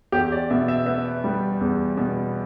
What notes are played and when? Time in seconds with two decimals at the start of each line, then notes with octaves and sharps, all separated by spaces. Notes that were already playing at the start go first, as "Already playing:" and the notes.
0.12 E2 G4
0.32 D5
0.50 B2 E5
0.68 E5
0.86 B3 E5
1.24 G3
1.61 E2
1.97 B2